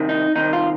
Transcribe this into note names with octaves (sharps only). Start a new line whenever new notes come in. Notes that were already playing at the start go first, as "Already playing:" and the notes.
Already playing: C2 C3 D#3
D#4
C2 C3 D#3 D#4
F4